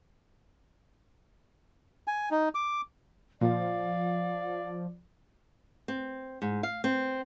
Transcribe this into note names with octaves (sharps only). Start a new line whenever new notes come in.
G#5
D#4
D6
A#2 F3 D5 F5
C4
G#2
F5
C4